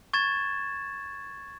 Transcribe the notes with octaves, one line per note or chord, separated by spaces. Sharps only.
C#6 G#6 A6 E7